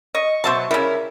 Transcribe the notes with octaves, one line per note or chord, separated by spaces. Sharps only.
D#5 C#6
B2 F#3 C5 E5 A5
C#3 G3 E4 A#4